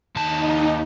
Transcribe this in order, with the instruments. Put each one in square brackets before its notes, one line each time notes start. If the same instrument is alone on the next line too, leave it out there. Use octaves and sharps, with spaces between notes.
[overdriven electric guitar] D#2 A5 [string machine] D#4